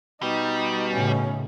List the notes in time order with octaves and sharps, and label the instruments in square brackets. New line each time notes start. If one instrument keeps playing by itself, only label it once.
[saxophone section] B2 [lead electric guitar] G3 [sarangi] D#4
[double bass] A2 C#3 [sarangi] C#4